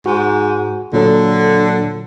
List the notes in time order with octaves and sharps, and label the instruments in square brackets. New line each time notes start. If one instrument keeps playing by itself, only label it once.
[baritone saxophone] G#2 [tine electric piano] F#4
[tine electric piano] A#2 F#3 A4 [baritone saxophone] D3